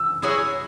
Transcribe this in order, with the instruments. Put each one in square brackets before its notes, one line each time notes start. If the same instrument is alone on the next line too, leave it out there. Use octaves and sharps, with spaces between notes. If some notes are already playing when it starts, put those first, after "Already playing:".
Already playing: [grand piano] E6
[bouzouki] F#3 C#4 E4 G#4